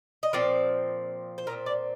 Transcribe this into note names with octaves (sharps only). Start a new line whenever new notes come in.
D#5
A#2 F3 C4 D5
C5
A#2 F3 C4 A#4
D5